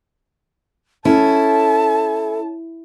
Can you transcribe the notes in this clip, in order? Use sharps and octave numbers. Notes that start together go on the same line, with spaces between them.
C#4 E4 A4 A5